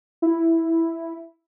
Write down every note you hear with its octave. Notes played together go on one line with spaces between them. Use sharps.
E4